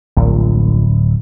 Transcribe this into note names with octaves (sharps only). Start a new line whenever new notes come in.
D1 A#1